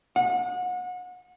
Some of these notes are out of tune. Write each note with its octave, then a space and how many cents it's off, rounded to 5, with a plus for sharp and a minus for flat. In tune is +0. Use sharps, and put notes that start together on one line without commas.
F#5 -30